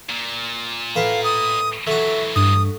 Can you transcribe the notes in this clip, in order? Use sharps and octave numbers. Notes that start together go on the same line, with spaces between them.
A#2
A2 B4 F5
D#6
E3 F#3 A3 F#4 E5
G2 D#6